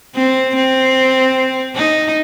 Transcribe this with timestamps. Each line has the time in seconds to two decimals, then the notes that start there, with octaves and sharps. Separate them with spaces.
0.15 C4
0.55 C4
1.75 D#4